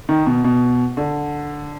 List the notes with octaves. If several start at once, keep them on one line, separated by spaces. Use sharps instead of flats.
D#3
B2
B2
D3